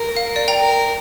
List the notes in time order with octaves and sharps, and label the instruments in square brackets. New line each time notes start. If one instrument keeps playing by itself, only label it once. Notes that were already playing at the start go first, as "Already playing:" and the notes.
Already playing: [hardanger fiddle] A#4
[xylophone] F5
D5
G5 A#5
[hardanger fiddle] A#4